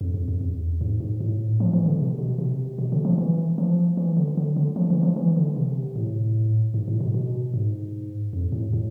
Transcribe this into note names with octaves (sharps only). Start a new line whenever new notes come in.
F2
F2
F2
E2
G#2
G#2
A2
F3
E3
D3
C3
B2
C3
B2
D3
F3
E3
F3
E3
D3
D3
D3
F3
E3
F3
E3
D3
C3
A2
G#2
A2
B2
B2
G#2
F2
A2
A2